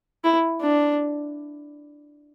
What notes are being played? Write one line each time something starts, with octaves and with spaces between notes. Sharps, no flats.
E4
D4